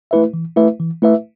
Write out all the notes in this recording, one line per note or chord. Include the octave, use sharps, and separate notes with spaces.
A3 E4 B4 E5
E3
A3 E4 B4 E5
E3
A3 E4 B4 E5